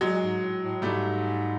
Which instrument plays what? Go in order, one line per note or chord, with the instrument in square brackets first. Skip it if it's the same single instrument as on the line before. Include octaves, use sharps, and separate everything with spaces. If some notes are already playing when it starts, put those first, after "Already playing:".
[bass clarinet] A#2 [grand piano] F#3 G#3
[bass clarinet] G#2
A2
A2
[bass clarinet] G#2 [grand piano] G3 A3